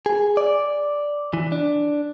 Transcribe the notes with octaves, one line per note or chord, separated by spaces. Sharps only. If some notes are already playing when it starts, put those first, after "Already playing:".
G#4
D5
E3
D4